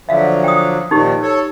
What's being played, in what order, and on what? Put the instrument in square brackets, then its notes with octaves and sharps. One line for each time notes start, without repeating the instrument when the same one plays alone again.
[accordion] D3 F3 F#3 [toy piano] E5 F5
[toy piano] G5 D#6
[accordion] A#2 D#3 F3 [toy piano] D#4 G4
[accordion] A4 C#5